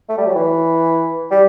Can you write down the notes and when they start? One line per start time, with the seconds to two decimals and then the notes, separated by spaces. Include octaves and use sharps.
0.09 A3
0.18 G3
0.26 F#3
0.35 E3
1.31 G3